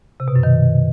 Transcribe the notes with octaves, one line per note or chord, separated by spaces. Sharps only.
C3
B2
F#2
D#3